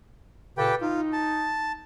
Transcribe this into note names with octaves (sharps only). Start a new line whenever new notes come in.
A#2 C#3 G4 A4 B4 G5
D#4 F4
A5